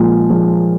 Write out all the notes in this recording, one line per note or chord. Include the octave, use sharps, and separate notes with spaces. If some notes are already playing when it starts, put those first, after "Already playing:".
Already playing: A#2 F3 G#3
F3 G#3